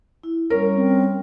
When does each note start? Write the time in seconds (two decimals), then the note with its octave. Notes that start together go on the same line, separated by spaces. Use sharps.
0.23 E4
0.50 G3 C#4 A#4 C#5
0.75 C4